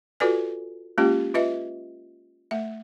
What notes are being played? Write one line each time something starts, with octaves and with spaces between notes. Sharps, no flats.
F4 F#4 A4 B4 D5 G#5
G#3 A#3 C#4 F4 G4
F4 B4 D#5 E5
A3 E5